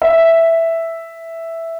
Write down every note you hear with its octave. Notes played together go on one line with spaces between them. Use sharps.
E5